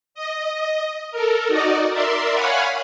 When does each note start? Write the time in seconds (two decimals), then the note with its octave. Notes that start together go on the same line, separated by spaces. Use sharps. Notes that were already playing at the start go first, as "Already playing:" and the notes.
0.15 D#5
1.11 A4 A#4
1.48 D#4 F#4 D5 D#5
1.90 A#4 D5 E5 C6
2.33 C#5 F5 F#5 G#5 B5